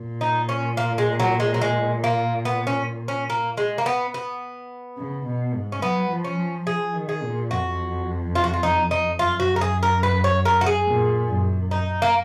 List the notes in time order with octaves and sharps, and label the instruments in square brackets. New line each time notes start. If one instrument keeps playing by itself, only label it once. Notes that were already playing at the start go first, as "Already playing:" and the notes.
Already playing: [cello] A#2
[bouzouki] D#4
C#4
A#3
G#3
F#3
G#3
F#3
G#3
A#3
B3
C#4
C#4
A#3
G#3
A#3
B3
B3
[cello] C#3
B2
G#2
[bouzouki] C#4
[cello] F#3 [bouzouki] B3
[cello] F3
[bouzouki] C#4
[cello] F3
[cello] F3 [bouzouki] G#4
[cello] D#3
[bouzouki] G#4
[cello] A#2
[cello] F2 [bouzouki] F#4
[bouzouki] F4
F#4
F4
D#4
D#4
[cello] F#2 [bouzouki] F4
[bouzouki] F#4
A#4
G#4
A#4
B4
C#5
A#4
F#4
G#4
[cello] A#2
F#2
[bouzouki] D#4
A#3